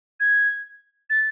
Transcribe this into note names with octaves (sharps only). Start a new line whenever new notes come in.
G#6
A6